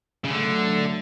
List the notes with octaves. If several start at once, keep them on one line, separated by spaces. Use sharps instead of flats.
C#3
D3 F#3 A3